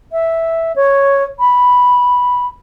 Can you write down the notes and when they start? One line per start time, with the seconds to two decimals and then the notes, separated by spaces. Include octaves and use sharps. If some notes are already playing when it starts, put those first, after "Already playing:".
0.12 E5
0.76 C#5
1.39 B5